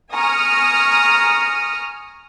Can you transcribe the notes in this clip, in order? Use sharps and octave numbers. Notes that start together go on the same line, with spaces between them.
G#5 A#5 C#6 D#6 F6